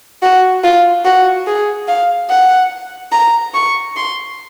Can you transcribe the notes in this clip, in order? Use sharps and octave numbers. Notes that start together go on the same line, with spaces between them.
F#4
F4
F#4
G#4
F5
F#5
A#5
C#6
C6